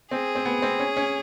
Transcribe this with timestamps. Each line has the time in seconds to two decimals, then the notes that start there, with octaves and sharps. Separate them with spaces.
0.11 C4 G#4
0.35 C4
0.45 B3
0.62 C4
0.80 C#4
0.97 C#4